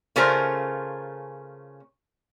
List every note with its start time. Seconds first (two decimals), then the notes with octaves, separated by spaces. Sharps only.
0.16 C#3 A3 C#4 F4 A#4 C5